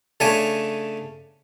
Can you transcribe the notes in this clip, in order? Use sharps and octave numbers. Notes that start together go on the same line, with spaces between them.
C#3 A3 C#4 D4 G#5